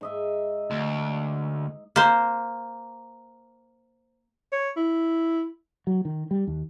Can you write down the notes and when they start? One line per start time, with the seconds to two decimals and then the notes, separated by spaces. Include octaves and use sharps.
0.01 G#2 D#5 E5
0.71 D2
1.96 A#3 C5
4.52 C#5
4.77 E4
5.87 F#3
6.05 D#3
6.31 G3
6.47 D#2